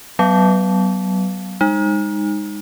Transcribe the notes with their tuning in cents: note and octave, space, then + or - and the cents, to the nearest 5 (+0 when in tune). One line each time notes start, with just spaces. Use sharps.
F#3 +35 B3 +5 F5 +0
G#3 -30 D#4 -10